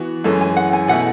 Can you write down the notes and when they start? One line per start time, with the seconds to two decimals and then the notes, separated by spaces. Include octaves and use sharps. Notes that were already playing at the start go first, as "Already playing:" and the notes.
Already playing: E3 B3 F#4
0.24 F#2 E3 G#3 C#4 A4
0.41 G#5
0.57 F#5
0.73 G#5
0.88 B2 A3 E4 F#5